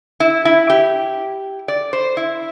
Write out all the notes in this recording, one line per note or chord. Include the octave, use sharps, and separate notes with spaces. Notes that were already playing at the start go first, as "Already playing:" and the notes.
E4
E4
G4
D5
C5
E4